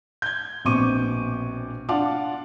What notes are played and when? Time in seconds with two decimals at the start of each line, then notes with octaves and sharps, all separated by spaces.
0.22 G6 G#6
0.65 A#1 B2 C4 C#6 D6 D#7
1.89 D4 F4 F5 F#5 A5 D6